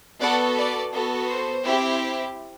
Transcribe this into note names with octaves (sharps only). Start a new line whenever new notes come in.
B3 F#4 A4 D5 F#5
B4 D5
B3 F#4 A4
C5
C4 E4 G4